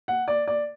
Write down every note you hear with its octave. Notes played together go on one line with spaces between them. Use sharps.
F#5
D5
D5